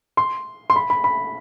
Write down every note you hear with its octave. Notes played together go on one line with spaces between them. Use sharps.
C6
C6
B5
B5
B5